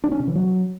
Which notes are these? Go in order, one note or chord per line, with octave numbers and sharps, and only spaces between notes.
D4
C#4
C3
E3
F#3